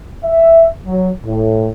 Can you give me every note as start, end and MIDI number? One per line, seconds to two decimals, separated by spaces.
0.25 0.66 76
0.86 1.10 54
1.25 1.70 45